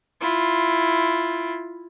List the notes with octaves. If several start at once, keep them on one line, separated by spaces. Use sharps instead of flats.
E4 F4